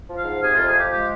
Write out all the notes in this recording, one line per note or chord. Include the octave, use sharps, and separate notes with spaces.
F3
F5
G#2
C3 G#4
F2 F4
G#4
F3 G4
G#3 G4